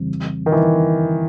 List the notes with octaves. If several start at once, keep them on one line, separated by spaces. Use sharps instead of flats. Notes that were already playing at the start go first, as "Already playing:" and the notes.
Already playing: F2 C#3 E3 G3 C4
D#3
E3